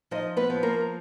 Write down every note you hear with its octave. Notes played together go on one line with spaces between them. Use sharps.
F3 D#4 D#5
B3 B4
F3
A#3 A#4